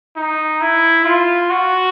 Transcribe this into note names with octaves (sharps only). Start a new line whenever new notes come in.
D#4
E4
F4
F#4